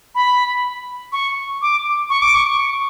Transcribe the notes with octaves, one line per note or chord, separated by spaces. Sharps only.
B5
C#6
D6
C#6
D6
C#6